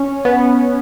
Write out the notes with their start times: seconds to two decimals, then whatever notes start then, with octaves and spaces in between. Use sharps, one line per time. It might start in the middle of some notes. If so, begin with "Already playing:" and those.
Already playing: C#4
0.25 B3